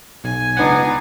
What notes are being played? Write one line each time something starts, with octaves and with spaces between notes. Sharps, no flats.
B1 G#5
C#2 B3 D4 D#4 F#5